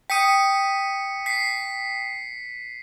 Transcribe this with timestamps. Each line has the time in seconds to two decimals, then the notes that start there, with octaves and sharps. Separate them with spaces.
0.10 G5 D#6 B6 C#7 D#7
1.26 B6 C7